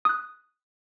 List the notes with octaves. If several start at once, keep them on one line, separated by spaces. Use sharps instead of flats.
D#6 F#6